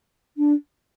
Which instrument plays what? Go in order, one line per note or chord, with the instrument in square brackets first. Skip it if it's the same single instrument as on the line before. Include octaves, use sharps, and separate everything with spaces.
[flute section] D4